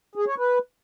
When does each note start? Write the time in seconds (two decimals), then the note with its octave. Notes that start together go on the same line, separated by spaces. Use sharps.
0.15 G#4
0.27 C#5
0.38 B4